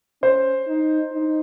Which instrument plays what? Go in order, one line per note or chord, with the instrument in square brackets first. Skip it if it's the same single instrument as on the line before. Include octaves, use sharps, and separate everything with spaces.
[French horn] C#4 [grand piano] C5
[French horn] D#4
D#4